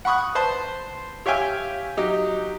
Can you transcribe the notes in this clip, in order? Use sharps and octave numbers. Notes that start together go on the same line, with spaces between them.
F#5 B5 C#6 D#6 F#6
B4 C5 A5 C6
G4 C#5 E5 F5 G5 G#5
F#3 D#4 G4